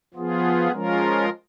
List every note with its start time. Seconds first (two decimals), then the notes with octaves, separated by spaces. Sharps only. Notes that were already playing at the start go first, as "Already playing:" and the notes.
0.14 F3 B3 F4 G#4
0.72 F3 G#3 C#4 F4 A#4